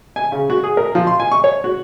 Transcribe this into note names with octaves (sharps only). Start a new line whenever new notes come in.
G#5
C#3
F#4
G#4
A#4
F3
C6
G#5
C#6
C#5
F#4